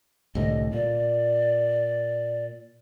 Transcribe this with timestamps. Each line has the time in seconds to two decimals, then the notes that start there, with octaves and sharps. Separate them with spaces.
0.35 C2 A2 D3 D#5
0.73 A#2 D5